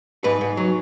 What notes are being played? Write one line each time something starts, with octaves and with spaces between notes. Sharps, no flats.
G#2 B4
G#2
F#3